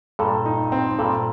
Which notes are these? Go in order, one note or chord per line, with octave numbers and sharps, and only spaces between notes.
G2 A#2 A4
D#4
C4
G2 A#2 A4